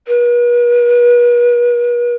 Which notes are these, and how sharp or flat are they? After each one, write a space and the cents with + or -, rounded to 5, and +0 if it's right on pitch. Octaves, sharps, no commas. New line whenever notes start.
B4 -45